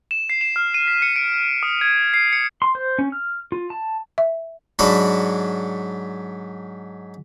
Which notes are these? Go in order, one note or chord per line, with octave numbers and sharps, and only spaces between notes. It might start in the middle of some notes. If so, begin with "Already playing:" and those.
E7
C7
E7
F6
D#7
B6
C#7
D7
D#6
G#6
C7
C#7
C6
C5
C#4
F6
F4
A5
E5
G#2 F#3 D4 F#4 B5